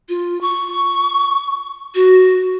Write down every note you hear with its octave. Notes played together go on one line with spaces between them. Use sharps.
F4
C#6
F#4